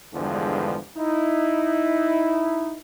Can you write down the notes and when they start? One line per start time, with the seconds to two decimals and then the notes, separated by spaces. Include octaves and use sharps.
0.14 E2 G2 D3 F3 G#3
0.97 D#4 E4